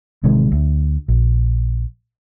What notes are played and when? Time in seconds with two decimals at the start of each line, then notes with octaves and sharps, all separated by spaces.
0.24 A1 C3 D#3 G#3
0.52 D2
1.08 A#1